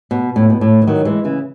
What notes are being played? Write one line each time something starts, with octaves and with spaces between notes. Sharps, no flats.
B2
A2
B2
A2
E3
D#3 F#3
E3 G#3
C#3 E3